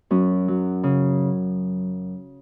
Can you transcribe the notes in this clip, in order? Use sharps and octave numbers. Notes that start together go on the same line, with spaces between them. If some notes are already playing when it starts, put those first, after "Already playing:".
F#2 C#4
F#3
C#3